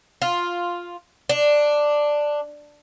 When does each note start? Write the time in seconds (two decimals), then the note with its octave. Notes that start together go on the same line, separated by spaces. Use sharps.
0.22 F4
1.29 D4